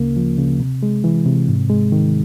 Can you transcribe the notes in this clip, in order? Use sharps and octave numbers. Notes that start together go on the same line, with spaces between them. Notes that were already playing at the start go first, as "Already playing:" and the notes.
Already playing: D2 C#3 A#3
F3
C#3
C3
G#3
E3
C3
G#2
G#3
D#3